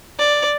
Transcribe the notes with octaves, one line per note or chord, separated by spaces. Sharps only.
D5